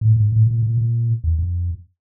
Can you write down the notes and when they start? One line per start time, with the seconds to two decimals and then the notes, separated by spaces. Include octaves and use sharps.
0.01 A2
0.16 G#2
0.32 A2
0.47 A#2
0.63 A#2
0.77 A#2
1.24 E2
1.39 F2